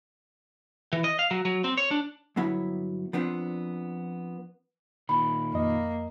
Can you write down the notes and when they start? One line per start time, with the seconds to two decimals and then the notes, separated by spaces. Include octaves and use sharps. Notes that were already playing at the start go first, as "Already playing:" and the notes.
0.93 E3
1.04 D#5
1.19 F5
1.31 F#3
1.45 F#3
1.64 C4
1.78 C#5
1.91 D4
2.36 G2 D3 F#3 B3 E4 C#5
3.13 F3 B3 C4 D4
5.09 A#2 D#3 B5
5.54 F2 A#3 D#5